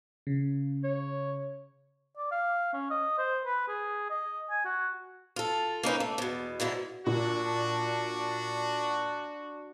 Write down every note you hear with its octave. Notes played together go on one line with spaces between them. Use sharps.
C#3
C#5
D5
F5
C#4
D#5
C5
B4
G#4
D#5
G#5
F#4
F4 A4
A#3 C#4 D#4 B4
A3
E2 B2
G#2 B2 D3 E4
A#2 D4 F#4